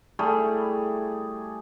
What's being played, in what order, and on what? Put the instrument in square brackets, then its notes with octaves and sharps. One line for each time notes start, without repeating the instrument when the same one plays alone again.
[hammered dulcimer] G3 A3 E4 G#4